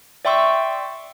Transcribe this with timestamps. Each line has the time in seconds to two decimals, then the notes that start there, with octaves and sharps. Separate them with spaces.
0.25 D5 E5 G5 C6 C#6 E6